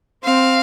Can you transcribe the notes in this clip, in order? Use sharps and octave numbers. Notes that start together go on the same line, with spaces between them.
C4 F5